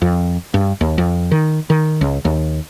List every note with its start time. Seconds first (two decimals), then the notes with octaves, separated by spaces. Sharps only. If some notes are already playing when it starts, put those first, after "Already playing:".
0.02 F2
0.54 G2
0.81 D#2
0.98 F2
1.31 D#3
1.70 D#3
2.01 C#2
2.25 D#2